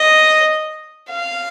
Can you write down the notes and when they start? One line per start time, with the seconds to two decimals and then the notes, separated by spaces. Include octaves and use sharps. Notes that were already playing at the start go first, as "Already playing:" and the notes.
Already playing: D#5
1.11 F5